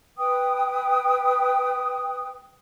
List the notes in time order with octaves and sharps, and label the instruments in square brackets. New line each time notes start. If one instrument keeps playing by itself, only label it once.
[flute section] B4 G5 D#6